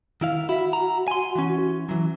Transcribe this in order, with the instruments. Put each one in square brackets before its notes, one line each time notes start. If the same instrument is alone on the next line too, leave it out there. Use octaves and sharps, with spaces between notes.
[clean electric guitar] D#3 E4 F5
[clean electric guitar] E4 E5 [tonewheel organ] F#4
[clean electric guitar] A#5
G#5 C6
E3 C#4
E3 F#3